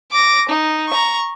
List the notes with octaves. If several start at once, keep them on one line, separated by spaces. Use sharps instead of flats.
D6 A#6
D#4
A#5 C#6